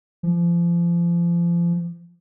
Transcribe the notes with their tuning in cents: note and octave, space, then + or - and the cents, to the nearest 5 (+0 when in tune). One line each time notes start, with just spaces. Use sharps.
F3 -30